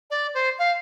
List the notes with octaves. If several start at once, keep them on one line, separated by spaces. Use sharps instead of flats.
D5
C5
F5